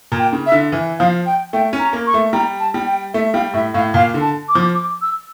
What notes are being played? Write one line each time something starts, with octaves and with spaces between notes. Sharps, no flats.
A#2
G5
C#3
E5
D3
E3
F3 F5
G5
A3 G5
C#4
A#5
A#3
C#6
A3
G3 A#5
A5
G3
G5
A3 E5
G3 F5
A2 E5
A2 F5
A#2 F5
D3
A5
D6
F3
D6
E6